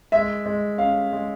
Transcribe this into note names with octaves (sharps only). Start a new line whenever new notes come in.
G#3 E5
G#3
C#4 F5
G#3